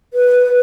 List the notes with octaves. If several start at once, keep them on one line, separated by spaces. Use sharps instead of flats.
B4